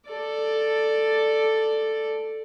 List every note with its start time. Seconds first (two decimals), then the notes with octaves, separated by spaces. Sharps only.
0.11 A4 D5